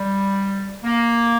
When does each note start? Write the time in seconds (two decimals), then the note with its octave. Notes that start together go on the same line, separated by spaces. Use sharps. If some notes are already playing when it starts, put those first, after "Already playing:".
Already playing: G3
0.84 A#3